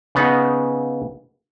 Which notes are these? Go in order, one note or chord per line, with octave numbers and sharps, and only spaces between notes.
C#3 B3 D#4 F#5